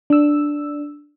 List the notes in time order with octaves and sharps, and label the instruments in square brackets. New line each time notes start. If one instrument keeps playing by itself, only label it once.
[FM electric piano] D4 E6